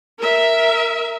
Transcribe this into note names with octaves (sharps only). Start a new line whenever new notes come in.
A#4 E5